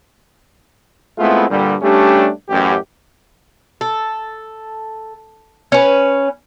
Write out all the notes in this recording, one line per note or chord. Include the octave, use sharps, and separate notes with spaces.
G#3 A3 B3 C4 E4 F4
G2 A#2 D3 G3
G3 A3 C#4 D4 G4
A1 F#2 G4
A4
C#4 B4